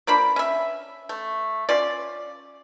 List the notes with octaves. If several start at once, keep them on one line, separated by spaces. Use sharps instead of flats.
F3 A#3 D4 B5
C#4 E5
A3
C#4 F4 D5